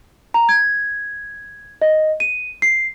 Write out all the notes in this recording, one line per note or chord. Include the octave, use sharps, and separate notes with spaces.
A#5
G#6
D#5
D#7
C7